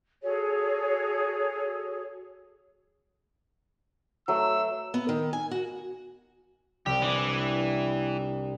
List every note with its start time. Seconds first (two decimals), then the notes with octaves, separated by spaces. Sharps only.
0.23 F#4 G#4 A4 C#5
4.28 F#3 A3 E6
4.94 B3
5.09 D#3
5.33 G#5
5.51 F#4
6.86 C2 G4
7.02 E3 D4